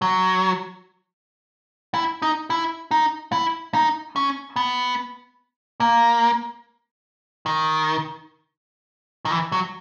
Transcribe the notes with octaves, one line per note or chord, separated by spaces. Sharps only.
F#3
E4
D#4
E4
D#4
E4
D#4
C#4
B3
A#3
D#3
D#3
E3
F#3